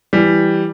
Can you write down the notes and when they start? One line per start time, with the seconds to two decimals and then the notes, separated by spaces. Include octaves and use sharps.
0.13 E3 G3